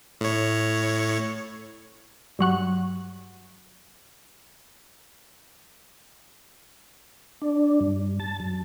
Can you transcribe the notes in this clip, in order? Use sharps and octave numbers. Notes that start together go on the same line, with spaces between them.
A2 C#5
G2 F#3 F#5 C#6
D4
G2
A5
F#2